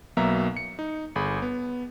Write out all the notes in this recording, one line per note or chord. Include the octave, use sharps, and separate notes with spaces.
B1 F#3 A#3 B3 E5 A#5
C#7
D#4
G1 G#4 B5
B3